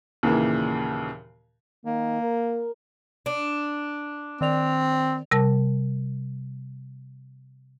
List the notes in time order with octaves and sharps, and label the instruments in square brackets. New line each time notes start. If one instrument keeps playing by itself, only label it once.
[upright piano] D#2 A#2 C#3 E3
[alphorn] D#3 [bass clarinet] A#3
[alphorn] A#4
[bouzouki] D4
[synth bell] D#3 D5 F7 [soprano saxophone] C4
[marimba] C3 G3 A#4 A5